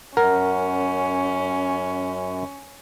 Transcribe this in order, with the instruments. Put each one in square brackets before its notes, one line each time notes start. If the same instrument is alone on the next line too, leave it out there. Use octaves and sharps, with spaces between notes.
[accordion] F#2 [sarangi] C#4 [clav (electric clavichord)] A#4 [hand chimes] F#5